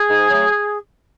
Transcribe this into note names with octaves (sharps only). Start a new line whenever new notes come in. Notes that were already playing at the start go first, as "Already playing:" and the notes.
Already playing: G#4
G#2
F#3 A3